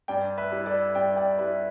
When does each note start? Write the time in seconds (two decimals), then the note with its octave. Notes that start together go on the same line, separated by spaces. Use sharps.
0.08 G2 D5 G5
0.37 B4 E5
0.52 G3 E4
0.66 A4 D5
0.95 G2 D5 G5
1.16 D5 G5
1.38 G3 E4 B4 E5